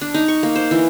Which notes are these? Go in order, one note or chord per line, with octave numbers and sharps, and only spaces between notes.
D4
D#4
C#6
A#3
C5
E3